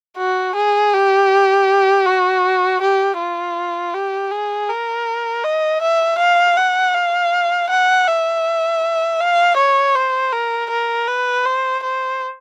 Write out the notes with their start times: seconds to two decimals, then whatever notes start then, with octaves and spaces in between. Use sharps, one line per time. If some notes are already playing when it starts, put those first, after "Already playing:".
0.17 F#4
0.55 G#4
0.93 G4
2.06 F#4
2.81 G4
3.19 F4
3.94 G4
4.31 G#4
4.69 A#4
5.44 D#5
5.82 E5
6.19 F5
6.57 F#5
6.94 F5
7.70 F#5
8.07 E5
9.20 F5
9.57 C#5
9.95 C5
10.32 A#4
10.70 A#4
11.08 B4
11.45 C5
11.83 C5